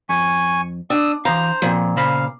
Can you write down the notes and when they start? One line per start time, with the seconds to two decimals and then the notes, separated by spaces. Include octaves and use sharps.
0.09 F2 G#5 C#6
0.90 D4 D#6 E6
1.25 E3 C5 F5 A#5
1.62 A#2 F3 C4
1.97 C#3 C5 F5 B5